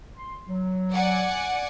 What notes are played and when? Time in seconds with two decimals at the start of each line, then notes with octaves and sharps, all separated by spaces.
0.17 C6
0.47 F#3
0.93 D5 F#5 G#5